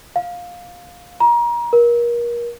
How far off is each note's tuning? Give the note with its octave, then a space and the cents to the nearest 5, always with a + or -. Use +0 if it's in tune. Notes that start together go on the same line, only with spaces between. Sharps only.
F5 +15
A#5 +30
A#4 +30